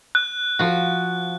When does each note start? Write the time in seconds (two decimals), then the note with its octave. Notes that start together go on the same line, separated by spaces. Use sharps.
0.15 F#6
0.59 F3 F#4